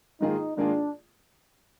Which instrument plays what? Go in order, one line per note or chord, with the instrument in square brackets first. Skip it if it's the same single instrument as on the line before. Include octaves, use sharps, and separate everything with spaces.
[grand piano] G#2 D#3 A#3 F4 G#4 [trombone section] D#4
[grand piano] G#2 D#3 A#3 F4 G#4 [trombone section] D4